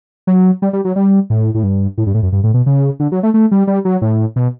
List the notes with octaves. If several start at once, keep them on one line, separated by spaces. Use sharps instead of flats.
F#3
G3
G3
F#3
G3
A2
A2
G2
A2
G2
A2
F#2
G2
A2
B2
C#3
D3
F#3
A3
A3
G3
G3
F#3
A2
B2